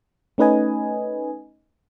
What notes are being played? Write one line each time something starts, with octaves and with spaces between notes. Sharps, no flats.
A3 C#4 D#4 B4 D#5 G#5